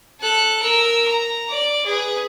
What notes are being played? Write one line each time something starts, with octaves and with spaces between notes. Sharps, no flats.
A4 F#6
A#4 E6
A#5
D5
G#4 B4